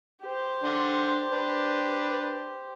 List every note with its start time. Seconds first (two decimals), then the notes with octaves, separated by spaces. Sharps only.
0.22 G4 C5
0.64 D3 D4 C6
1.32 D4 B4